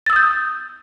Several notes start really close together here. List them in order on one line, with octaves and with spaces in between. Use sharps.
A6 E6 D#6 G6